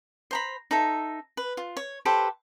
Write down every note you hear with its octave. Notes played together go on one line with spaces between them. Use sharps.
C5 A#5 B5
D#4 A4 E5
B4
F4
C#5
G4 A4 B4 C5